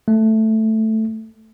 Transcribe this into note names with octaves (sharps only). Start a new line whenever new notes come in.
A3